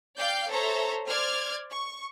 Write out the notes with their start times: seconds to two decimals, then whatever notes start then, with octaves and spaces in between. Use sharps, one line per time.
0.17 D5 F5 G5 G6 C7
0.50 A4 C5 C#5 E5 A#5
1.07 C5 D5 F6 G#6
1.70 C#6